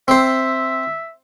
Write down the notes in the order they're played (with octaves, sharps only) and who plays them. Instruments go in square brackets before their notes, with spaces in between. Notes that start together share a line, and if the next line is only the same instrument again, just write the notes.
[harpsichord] C4 C5 [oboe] E5